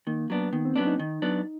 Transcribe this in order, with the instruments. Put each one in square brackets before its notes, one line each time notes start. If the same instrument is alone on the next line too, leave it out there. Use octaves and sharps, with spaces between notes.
[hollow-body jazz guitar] D#3 [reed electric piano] A#3
[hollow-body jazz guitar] F#3 B3 D4
[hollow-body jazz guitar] D#3 [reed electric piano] B3
[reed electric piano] C4
[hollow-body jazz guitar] F#3 B3 D4 [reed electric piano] C#4
[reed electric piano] D#4
[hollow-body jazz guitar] D#3
F#3 B3 D4